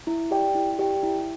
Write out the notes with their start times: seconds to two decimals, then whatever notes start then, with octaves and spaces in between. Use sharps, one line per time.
0.07 E4
0.31 G4 D5 G5
0.55 E4
0.79 G4 D5 G5
1.03 E4